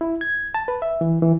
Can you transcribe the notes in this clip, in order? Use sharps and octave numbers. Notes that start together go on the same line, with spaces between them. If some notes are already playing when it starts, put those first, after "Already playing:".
E4
G#6
A5
B4
E5
E3
E3